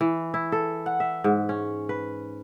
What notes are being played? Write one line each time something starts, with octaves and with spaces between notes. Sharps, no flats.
E3
E4
A4
F#5
E5
G#2
C#4
B4